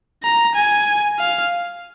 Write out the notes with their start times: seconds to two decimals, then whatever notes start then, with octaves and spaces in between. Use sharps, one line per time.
0.23 A#5
0.55 G#5
1.19 F5